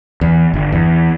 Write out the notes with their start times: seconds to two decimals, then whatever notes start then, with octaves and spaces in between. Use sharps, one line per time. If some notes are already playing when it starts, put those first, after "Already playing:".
0.21 E2
0.54 G1
0.72 E2